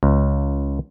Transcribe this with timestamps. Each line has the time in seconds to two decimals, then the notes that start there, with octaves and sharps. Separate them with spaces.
0.03 C#2